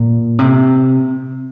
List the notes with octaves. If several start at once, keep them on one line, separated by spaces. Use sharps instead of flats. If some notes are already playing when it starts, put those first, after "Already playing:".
Already playing: A#2
C3